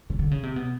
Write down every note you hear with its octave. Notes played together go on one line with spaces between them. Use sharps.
C#3
D3
C#3
C3
B2